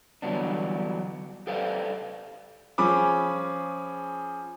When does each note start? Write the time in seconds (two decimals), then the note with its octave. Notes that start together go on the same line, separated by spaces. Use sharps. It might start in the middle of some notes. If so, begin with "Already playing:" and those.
0.22 D3 E3 F#3 G3 B3 D4
1.47 G4 A4 B4 C5 D5 F5
2.78 F3 C#4 G#4 B5 D6